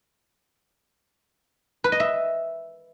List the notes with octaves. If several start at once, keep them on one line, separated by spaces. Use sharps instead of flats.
B4
D#5
E5